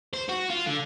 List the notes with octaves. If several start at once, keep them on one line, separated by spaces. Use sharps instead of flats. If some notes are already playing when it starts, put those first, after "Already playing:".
C5
F#4
F4
D3